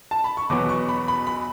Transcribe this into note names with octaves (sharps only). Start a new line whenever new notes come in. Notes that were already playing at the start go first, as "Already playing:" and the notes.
A5
B5
C#6
E2 B2 F#3 B3 D6
C#6
B5
B5
B5